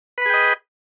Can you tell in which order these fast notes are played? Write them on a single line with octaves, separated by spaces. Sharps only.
B4 B5 G#4 G5 D#5